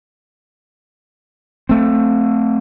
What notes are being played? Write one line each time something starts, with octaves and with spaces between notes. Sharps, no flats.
A3 C4